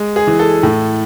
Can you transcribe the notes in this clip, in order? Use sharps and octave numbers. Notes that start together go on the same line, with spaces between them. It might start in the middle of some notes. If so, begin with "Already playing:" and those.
Already playing: G#3
G#4
E3
A4
A2